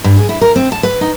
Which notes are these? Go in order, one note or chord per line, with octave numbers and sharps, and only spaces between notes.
G2
G#4
E4
A#4
C4
A5
B4
D#4